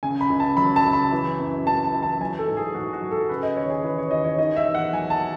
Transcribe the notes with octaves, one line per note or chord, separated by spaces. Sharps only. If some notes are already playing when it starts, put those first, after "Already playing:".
C#3 G#5
B5
C#2
A5
F#3 B5
A5
C#2
B5
E3
F#2
F#2 A5
A5
E3
A5
F#3 G#5
A4
G#2
G#4
G#2 F#4
F#4
F#3
A4
C#3 B4
D#5
D#2 C#5
G#4
E3 B4
C#5
D#2 D#5
C#5
D#3 D#5
E5
E2
F#5
F#3 G#5
A5